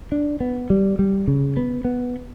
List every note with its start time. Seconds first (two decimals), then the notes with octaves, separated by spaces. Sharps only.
0.12 D4
0.40 B3
0.70 G3
0.99 G3
1.28 C#3
1.57 B3
1.85 B3